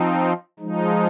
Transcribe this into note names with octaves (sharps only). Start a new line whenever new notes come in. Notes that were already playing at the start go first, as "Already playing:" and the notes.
Already playing: F3 C4 D#4
F3 G#3 D#4